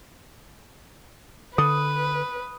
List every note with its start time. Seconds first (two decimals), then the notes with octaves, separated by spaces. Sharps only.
1.58 D3 B4 D#6